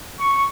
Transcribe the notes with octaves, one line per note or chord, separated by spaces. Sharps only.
C#6